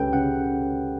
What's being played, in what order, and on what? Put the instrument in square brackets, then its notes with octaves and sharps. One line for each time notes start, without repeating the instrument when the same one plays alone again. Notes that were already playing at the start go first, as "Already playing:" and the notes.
Already playing: [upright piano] C#2 C#4 [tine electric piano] G4 A4 B4 G5
[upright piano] C#3 [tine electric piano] F#5